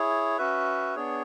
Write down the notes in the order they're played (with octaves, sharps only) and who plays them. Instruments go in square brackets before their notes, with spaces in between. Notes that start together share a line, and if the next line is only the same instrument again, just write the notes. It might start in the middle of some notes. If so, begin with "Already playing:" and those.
Already playing: [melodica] E4 G#4 C#5
C#4 F#4 B4 E5
B3 D4 G#4 C#5